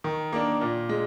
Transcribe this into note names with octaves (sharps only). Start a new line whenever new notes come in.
D#3
A#3 D4
A#2
G#3